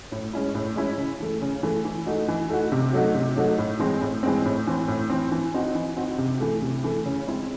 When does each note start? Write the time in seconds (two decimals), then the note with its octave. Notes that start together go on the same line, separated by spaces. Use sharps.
0.12 A2
0.33 G#3 C#4 E4
0.55 A2
0.76 G#3 C#4 E4
0.98 C#3
1.20 E3 A3
1.42 C#3
1.63 E3 A3
1.85 E3
2.06 A3 D#4 F#4
2.28 E3
2.50 A3 D#4 F#4
2.72 C3
2.93 F#3 A3 D#4 F#4
3.15 C3
3.36 F#3 A3 D#4 F#4
3.58 A2
3.79 E3 G#3 C4
4.01 A2
4.23 E3 G#3 C4
4.45 A2
4.67 E3 C4
4.88 A2
5.10 E3 C4
5.31 E3
5.54 C4 D#4 F#4
5.75 E3
5.97 C4 D#4 F#4
6.18 C3
6.40 E3 A3
6.62 C3
6.84 E3 A3
7.05 C#3
7.27 G#3 C4 E4